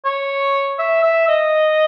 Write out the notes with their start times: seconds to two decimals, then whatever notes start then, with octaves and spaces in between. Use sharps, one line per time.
0.05 C#5
0.79 E5
1.03 E5
1.28 D#5